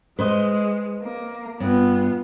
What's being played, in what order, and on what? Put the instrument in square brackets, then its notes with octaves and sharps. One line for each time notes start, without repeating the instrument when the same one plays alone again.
[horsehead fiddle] G#3 [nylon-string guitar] B4 C5 D#5
[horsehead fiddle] A#3
[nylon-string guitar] G2 [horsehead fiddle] B3 F4